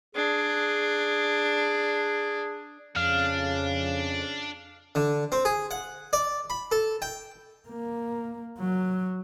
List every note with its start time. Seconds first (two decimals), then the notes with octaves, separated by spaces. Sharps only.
0.15 D4 G#4
2.96 F2 C#3 D4 F5
4.95 D3
5.32 C4
5.45 G#4
5.71 F#5
6.13 D5
6.50 B5
6.72 A4
7.02 G5
7.69 A#3
8.58 F#3